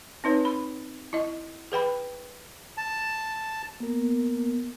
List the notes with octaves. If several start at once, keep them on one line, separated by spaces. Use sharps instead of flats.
C4 D#4 B4 C#5
B5
E4 D#5
G#4 B4 G5 B5
A5
A#3 B3 A#4